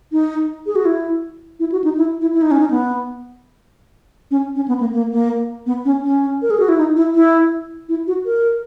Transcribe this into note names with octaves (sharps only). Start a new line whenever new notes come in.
D#4
G#4
F#4
E4
E4
F#4
D#4
E4
E4
E4
D#4
C#4
D#4
B3
C#4
C#4
B3
A#3
A#3
A#3
B3
C#4
C#4
A#4
G#4
F#4
E4
D#4
E4
E4
E4
F#4
A#4